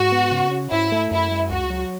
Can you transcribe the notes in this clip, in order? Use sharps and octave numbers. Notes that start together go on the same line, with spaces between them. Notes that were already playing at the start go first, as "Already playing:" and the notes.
Already playing: G#2 F#4
B3
C#3
C#4
G#2 E4
A3
F#2 E4
G#3
C#2 F#4
F#3